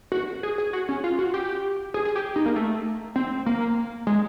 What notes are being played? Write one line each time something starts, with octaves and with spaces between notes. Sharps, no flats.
F#4
G#4
G#4
F#4
C#4
F4
F#4
G4
G#4
G#4
G4
D#4
A#3
A3
C4
A#3
G#3